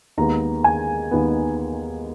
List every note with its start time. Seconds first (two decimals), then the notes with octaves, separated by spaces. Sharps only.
0.17 D#2 D#3 G#3 B3 A#5
0.64 G#5
1.11 D#2 D#3 G#3 B3